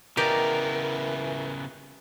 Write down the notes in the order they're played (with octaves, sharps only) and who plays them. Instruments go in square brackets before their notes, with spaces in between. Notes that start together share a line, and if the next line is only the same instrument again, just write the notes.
[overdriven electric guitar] C#3 B3 [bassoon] E3 [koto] G4 D5 D#5 [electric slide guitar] A#4